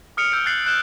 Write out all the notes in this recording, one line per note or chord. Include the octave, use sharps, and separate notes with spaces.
D#6 F6 C#7 D7 F7
E6 G6 C#7 D7
F#6 G6 A6 C7 F#7
F#6 G6 E7 G7